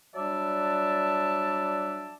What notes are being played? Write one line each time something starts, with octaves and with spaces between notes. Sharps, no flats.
F#3 G3 D4 D5 E5 A5